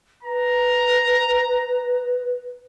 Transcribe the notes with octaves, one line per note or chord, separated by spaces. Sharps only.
B4 A#5